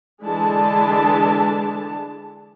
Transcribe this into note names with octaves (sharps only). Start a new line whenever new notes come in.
D3 E3 G#3 D4 A5